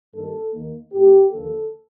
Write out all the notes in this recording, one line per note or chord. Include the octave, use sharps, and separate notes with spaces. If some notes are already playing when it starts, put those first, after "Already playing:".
G2 D#3 G3 A#3 A4
D#2 D#3 A#3
A2 A3 C4 G4
D#2 D3 F3 A#3 A4